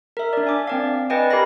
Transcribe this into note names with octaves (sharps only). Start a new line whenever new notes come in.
A#4 E5
D4 D5
G#5 D6
C4 D5 F5
B4 D5 D#5 G5 G#5
G4 A#4 F5 B5 A#6